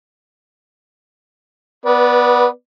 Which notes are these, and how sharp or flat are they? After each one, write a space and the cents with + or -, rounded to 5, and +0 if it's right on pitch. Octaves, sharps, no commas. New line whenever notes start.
B3 +0 B4 -25 D5 +0